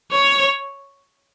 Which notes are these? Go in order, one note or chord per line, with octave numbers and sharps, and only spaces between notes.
C#5